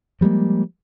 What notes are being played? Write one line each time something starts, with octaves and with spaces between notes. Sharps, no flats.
F3 G3 G#3 A#3